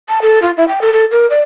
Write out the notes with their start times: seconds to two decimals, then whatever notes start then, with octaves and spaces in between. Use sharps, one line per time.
0.09 A5
0.21 A4
0.42 F4
0.57 E4
0.68 G5
0.81 A4
0.93 A4
1.11 A#4
1.30 D5